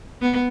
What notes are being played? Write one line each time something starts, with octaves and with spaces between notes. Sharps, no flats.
B3